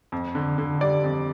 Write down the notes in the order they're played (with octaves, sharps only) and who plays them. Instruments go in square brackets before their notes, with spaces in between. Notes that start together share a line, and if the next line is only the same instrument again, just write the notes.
[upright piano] F2
D3
D3
G3 D5
F2